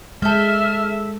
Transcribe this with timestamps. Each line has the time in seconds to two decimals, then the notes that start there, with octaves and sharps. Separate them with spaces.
0.22 G#3 A4 E5 F6 G6